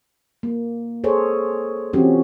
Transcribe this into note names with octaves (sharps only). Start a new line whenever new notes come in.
A#3
G#4 A4 C5 C#5
E3 F3 C4 C#4 F#4 G4